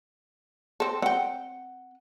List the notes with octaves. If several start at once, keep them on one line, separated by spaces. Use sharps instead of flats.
C4 A4
C4 F#5 G5